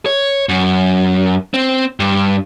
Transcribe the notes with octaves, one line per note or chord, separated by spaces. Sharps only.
C#5
F#2
C4
G2